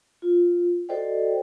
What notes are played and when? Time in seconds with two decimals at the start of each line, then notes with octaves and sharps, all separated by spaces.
0.22 F4
0.89 F#4 A4 C5 D5 D#5 G5